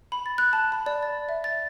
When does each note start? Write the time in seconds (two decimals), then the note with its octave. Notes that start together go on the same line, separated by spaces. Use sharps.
0.12 B5
0.26 A6
0.38 F#6
0.53 A5
0.72 B5
0.86 D5
1.03 A6
1.29 E5
1.44 A6